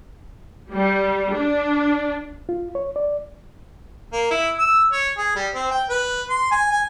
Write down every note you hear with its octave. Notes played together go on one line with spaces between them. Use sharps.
G3
D4
F4
C#5
D5
A#3
E4
E6
C#5
G#4
G3
C4
G5
B4
C6
G#5
G#5